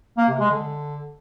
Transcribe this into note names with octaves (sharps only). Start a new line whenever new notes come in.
A#3
C3
G#3
D3